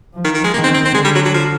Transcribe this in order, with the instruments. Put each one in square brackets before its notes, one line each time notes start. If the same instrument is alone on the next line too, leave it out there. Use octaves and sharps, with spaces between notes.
[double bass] F3
[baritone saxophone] D#3
D#3
G#3
[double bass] D#3 [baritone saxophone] A#3
[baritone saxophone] C4
C4
C4
[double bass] D3 [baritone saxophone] G#3
[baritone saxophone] G3
F#3
F#3
F3